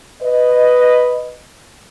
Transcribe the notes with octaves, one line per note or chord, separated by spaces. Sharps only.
B4 D#5